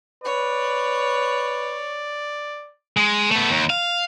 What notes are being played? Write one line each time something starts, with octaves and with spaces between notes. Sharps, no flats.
B4 C#5 D5
G#3
A3 B3
D#2
F5